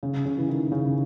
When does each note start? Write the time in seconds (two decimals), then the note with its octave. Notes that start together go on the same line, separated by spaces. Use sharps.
0.03 C#3
0.25 C#3
0.38 E3
0.49 D#3
0.72 C#3